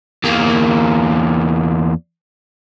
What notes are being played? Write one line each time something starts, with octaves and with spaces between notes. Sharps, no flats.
E2 A#3